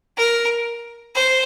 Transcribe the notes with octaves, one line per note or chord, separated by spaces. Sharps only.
A#4
C5